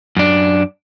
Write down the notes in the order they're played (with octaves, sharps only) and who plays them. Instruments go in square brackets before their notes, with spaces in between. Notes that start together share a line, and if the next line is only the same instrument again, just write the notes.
[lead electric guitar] F#2 D4